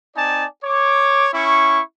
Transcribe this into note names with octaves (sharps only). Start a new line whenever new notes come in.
C4 D#4 D5 G#5 A5
C#5 D6
C#4 E4 C#6